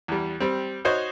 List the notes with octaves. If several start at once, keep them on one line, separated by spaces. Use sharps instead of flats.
E2 G3
G3 C4
D#4 F#4 C5 C#5